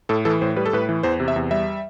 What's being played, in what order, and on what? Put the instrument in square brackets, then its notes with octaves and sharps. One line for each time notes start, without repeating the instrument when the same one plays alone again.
[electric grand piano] A2 A4
E3 A4
A2 C5
G3 B4
A4
A2 B4
E3
E2 C5
C3
E5
E2
G3 E5